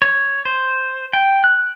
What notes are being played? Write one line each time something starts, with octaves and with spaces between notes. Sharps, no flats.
C#5
C5
G5
F#6